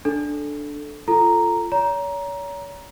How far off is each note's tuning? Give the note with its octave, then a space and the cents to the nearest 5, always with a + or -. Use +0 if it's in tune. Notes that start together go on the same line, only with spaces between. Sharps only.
D4 +0 A4 -10
F4 -20 A4 +0 A#5 +0
C#5 +40 A#5 +15